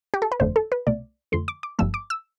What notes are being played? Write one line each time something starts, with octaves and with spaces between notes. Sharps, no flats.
G4
A4
B4
G1 F2 D3 A3 C5
A4
B4
C2 B2 A3 D5
F2 D3 F3 A3 C6
D6
D6
G1 G2 F3 A3 E6
D6
E6